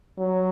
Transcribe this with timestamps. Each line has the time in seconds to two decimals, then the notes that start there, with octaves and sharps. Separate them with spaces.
0.18 F#3